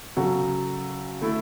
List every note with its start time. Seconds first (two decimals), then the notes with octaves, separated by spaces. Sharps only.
0.16 C#3 F#3 C#4 F#4 A4
1.21 D3 A3 E4 A4